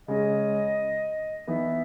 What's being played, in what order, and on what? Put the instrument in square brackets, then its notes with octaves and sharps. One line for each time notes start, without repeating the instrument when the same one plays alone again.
[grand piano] C#3 G#3 C#4 [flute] D#5
[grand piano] E3 B3 D#4 [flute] E5